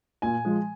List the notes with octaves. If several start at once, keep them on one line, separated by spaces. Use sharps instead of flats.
A#2 G#5
F3 G#3